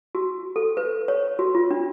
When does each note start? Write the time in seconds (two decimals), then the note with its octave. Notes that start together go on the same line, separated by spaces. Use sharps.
0.15 F#4
0.56 A4
0.77 B4
1.08 C#5
1.39 F#4
1.55 F4
1.71 D4